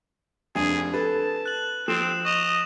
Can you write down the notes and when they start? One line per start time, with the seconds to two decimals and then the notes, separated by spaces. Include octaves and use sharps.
0.55 F1 D4 G#4 G#5
0.94 A4 B4 A5
1.46 F#6 F#7
1.88 F3 C4 D#6 F#6 E7
2.25 D#5 C#6 E7 F7